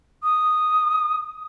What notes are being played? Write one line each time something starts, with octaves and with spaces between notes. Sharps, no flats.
D#6